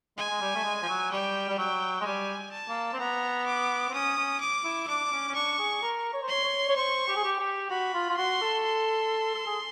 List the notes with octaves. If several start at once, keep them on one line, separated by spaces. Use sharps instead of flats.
G#3 G#5
G#3
G3
A3
G#3
F3
F#3
G3 G5
G3
F#3 G5
G#3
G3 G#5
A5
A#3
C4
B3 A#5
D6
C4
C#4 D#6
C#4
D6
E4
D4 D6
D4
C#4
C#4
D4 C#6
G#4
A#4
C#5
C5
C#5 C6
C#5
C#5
C5 C#6
G4
G#4
G4
G4
F#4 B5
F4
F4
F#4 C6
A4
C6
A4
G#4